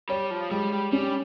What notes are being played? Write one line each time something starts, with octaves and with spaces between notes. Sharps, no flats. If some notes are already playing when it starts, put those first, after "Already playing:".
G3 C#5
F3
G3 G#3
G3
G3 C#4